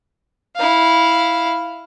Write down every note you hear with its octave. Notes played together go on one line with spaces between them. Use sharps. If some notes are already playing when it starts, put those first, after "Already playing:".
E4 F5